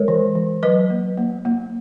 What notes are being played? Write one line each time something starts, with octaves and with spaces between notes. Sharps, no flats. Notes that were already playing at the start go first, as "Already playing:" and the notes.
Already playing: G#3 A#4 C#5
E3
E3
F#3 B4 D#5
A#3
A#3
A#3